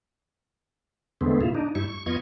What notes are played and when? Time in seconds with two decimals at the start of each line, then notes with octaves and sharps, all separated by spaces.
1.21 E2 D3 G#3 A3 B3 C4
1.41 A#2 C#3 E4 F4
1.55 D4 D#4
1.75 G2 G3 E4 C#6
1.88 C#6
2.06 F2 B3 F4 D#5 C#6 G#6